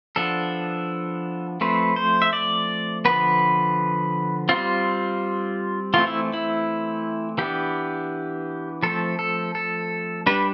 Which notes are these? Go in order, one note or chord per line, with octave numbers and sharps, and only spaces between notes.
F3 B3 D4 A4
F3 A3 C4 B4
C5
E5
D5
D3 F3 B3 B4
G3 C4 F4
E3 A3 C4 F4
E4
E4
E3 B3 D4 G4
F3 A3 C4 A4
A4
A4
G3 D4 B4